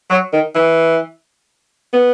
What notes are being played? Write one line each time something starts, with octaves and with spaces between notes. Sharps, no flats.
F#3
D#3
E3
B3